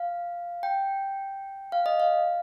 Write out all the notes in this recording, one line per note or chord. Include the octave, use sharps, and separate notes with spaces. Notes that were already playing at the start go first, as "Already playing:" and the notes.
Already playing: F5
G5
F5
D#5
F5